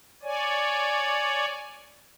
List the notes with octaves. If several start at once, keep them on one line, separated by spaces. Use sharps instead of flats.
C#5 D5 G#5